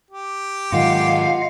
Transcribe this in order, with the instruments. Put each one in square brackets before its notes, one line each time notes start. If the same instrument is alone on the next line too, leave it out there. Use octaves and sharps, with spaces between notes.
[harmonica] G4
[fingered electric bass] G#2 D#3 F#3 [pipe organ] F4 D#5 F#5 [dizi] F5